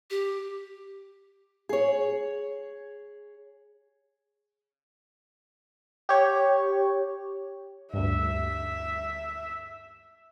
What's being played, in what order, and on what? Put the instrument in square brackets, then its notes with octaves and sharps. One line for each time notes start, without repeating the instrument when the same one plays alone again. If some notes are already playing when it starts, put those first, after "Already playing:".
[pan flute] G4
[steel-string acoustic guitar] G#4 C#5
[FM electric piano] G4 C#5
[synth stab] D2 G2 [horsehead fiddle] E5